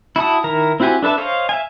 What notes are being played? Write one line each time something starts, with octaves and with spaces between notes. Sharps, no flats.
E4 F#4 A5 D#6
D#3 E4 A#4 A#5
C4 E4 F#4 G4 G#5
D4 A4 B4 E5 A5
C5 C#5 D#5 F5
E5 F5 G#5